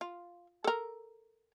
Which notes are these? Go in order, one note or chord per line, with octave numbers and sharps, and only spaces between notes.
F4
A4 A#4